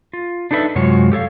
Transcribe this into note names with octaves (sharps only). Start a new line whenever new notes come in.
F4
D4 D#4 A4 B4 D5 E5
F#2 C3 G#3 F4 F#4 C#5
G4 A4 C#5 F5